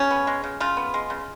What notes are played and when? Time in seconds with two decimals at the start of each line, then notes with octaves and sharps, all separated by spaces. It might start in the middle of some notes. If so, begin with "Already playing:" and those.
Already playing: C#3 C#4
0.11 B3
0.27 G#3
0.44 C#3
0.60 C#3 F4
0.77 B3
0.94 G#3
1.10 C#3